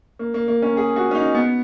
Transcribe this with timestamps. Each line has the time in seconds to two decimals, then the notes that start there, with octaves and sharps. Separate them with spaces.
0.19 A#3
0.34 A#3
0.48 A#3
0.62 C#4
0.77 G#4
0.96 F#4
1.11 C#4
1.15 D#4
1.35 B3